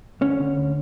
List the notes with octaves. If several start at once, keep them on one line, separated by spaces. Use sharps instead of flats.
D3 C#4
D3
D2